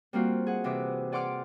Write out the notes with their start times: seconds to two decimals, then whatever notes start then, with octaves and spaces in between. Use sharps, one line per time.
0.13 G3 A#3 C4 F4 F#4
0.47 G#4 F#5
0.64 C3 E3 E5 D6
1.12 G#4 D5 F#5 C6 D6 F6